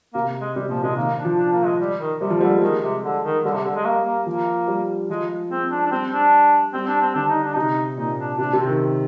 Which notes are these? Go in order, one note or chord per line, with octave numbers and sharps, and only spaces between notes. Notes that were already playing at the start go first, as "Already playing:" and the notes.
C3 A#3
G#3
C3 G3
A#2 F3
C3 G#3
D#3 A#3
D4
F3
D4
A#3
G#3
G3
D#3
C3 G3
F3
D3 G3
G#3
D#3 G#3
C3
D3
D#3
D3 G3
C3
D3
G#3
A#3
A#3
F3 A#3
G3
F3 G#3
G#3 C4
D4
D4
G3 C4
D4
G3 C4
D4
C4
D3 D4
D#4
D4
C3 D#4
A#2 D#4
D4
C3 D4
C3
C4
D#3